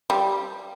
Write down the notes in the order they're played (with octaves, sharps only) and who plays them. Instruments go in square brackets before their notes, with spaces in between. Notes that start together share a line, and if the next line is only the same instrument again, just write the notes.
[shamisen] G3